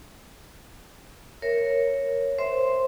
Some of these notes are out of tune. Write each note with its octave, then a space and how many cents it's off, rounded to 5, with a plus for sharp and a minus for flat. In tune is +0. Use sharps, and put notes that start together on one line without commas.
A#4 +0 C#5 -5 E5 +0
C5 +0 E5 +0 C6 +0